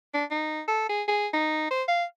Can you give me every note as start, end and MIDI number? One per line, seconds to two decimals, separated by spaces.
0.14 0.25 62
0.31 0.62 63
0.68 0.84 69
0.89 1.03 68
1.08 1.27 68
1.33 1.67 63
1.70 1.83 72
1.88 2.04 77